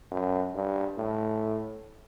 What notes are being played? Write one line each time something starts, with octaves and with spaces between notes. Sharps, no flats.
F#2
G2
A2